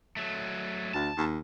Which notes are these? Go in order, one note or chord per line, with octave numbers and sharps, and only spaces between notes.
F#3 A3
D2 A5
D#2